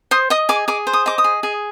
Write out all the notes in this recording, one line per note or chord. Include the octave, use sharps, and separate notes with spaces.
C5 D#6
D#5 D#6
G#4 D6
G#4 D6
C5
D#6
D#5 D6
D#6
G#4
G#4